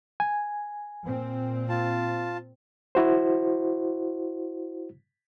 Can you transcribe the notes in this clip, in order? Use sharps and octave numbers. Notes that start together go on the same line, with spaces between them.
G#5
A#2 C4
F4 A5
E4 F#4 C5